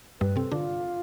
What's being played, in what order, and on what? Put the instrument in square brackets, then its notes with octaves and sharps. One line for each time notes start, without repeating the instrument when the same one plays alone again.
[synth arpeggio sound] G2 G3 [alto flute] B4
[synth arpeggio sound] C3 C4 [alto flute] A4
[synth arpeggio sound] D3 D4 [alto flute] F4